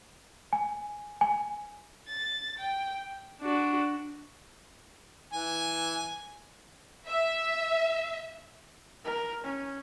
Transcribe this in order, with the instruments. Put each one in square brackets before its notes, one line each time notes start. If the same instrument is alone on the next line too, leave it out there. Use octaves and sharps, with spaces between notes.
[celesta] G#5
G#5
[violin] A6
G5
[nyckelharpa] D4 F#4
[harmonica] E3 G#5
[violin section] E5
[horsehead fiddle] A#4
C#4